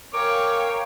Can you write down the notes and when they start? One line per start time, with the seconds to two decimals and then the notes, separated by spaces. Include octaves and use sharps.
0.14 A#4 C#5 F5 G5 G#5 D6